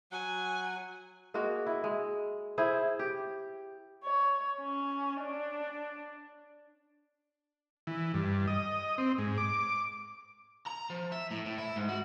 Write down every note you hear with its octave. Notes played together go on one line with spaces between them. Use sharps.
F#3 F#5 G#5
G#3 A#3 F#4
E4
G#3
E4 G#4 C5
G4
C#5
C#4
D4
E3
G2
D#5
C4
G#2
D6
A#5
F3
E5
A2
A2
E4
G#2
F#4